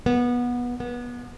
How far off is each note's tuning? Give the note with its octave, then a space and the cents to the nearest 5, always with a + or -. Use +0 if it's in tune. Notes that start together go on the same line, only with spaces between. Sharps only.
B3 -20
B3 -25